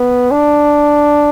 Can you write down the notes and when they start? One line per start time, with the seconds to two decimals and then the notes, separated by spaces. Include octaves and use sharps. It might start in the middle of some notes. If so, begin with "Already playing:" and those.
Already playing: B3
0.31 D4